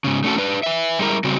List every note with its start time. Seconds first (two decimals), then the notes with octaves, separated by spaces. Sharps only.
0.04 G#2 C#3
0.24 A3 C#4 D#4 F#4 A4
0.38 D4 B4
0.63 B4 E5
0.99 G3 G#3 E4 A#4
1.24 C#3 G3 C4 F#4